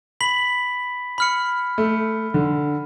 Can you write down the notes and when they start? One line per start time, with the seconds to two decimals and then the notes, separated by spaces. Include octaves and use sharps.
0.21 B5 B6 F#7
1.18 B5 F6 C#7
1.78 A3
2.34 D3